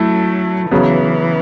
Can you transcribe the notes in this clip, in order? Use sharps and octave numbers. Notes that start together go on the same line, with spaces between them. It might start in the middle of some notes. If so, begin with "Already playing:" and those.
Already playing: F#3 A3 E4 A4
C#3 E3 F#3 B3